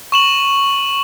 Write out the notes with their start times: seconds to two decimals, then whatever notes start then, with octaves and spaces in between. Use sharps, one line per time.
0.12 C#6 E7 F#7